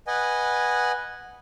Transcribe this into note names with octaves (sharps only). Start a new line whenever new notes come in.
B4 D#5 F#5 G#5